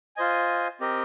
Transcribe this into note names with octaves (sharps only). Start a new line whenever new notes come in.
F4 C5 D#5 G#5
C4 G4 A#4 D#5